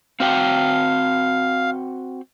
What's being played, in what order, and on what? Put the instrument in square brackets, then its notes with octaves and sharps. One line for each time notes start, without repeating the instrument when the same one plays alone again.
[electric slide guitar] C4 F#4 G5 [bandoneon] F5